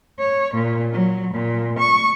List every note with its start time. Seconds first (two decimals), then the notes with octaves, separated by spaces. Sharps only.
0.18 C#5
0.53 A#2
0.92 F#3
1.33 A#2
1.78 C#6